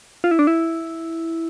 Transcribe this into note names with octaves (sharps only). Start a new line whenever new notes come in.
F4
E4
D4
E4